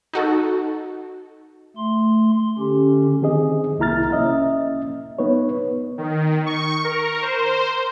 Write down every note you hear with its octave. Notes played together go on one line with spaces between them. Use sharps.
D#4 F#4 A4
A3 C6
D3 C#4 G4
D#3 C4 G#4 D#5
C2 A#3 E4 A#5 F6 A6
A#3 C#4 D#5 E5
B3 D#4 B4 C#5
D#3
C#6
A#4
C5